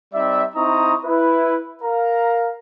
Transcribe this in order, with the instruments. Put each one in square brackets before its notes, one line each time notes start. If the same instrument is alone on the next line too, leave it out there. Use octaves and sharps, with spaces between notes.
[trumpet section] G3 C4 D#4 D5 E5
C4 D#4 E4 A#5 C#6 D#6
E4 B4
A#4 F5 A#5